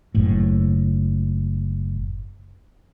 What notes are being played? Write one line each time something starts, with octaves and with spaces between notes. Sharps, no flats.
F#1 A2